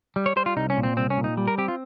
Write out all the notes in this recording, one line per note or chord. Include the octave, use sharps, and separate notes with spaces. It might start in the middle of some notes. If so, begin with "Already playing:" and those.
G3
C#5
G3 C5
F4
C2 D#4
C#4
A#2
C4
C2 C4
C#4
A#2
D#4
G3
A#4
C4 G4
F4